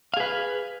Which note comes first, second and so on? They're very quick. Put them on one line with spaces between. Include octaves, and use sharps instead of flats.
F5 G#4 B4